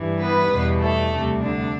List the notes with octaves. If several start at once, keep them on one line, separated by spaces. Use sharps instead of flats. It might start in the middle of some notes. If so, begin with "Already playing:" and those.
Already playing: G2 E3 G3
B3 B4
E2 B2 G3
A3 A4
D2 C3 G3
D3 D4